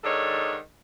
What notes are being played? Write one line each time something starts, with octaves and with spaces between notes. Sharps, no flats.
G#2 D#3 D4 A4 C#5